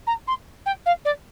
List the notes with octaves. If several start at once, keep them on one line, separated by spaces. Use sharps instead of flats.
A#5
C6
G5
F5
D5